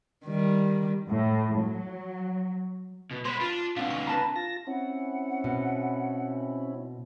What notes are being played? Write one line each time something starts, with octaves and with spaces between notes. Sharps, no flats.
D#3 G3
A2
F#3
B2
G#3 F#4 C5 B5 C6
D4 F4
B1 C4 D4 F5 F#5
D2 C#6
B4 A5 A#5
F4 A5 A#6
C4 C#4 E4 F#5
B2